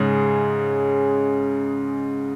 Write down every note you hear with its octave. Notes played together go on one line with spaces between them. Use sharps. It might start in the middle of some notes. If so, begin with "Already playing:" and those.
Already playing: G#2 C#3 G#3 C#4 G#4